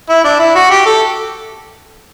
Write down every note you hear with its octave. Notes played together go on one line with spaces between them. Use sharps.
E4
D4
E4
F#4
G4
A4